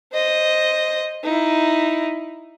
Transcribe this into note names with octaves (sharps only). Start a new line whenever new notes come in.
C5 D#5
D#4 E4